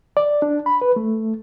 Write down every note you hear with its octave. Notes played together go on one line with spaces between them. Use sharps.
D5
D4
B5
B4
A3